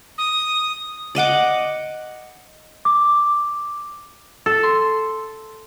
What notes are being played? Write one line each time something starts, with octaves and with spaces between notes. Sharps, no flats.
D#6
D5 D#5 F#5 D6
D6
A4
C6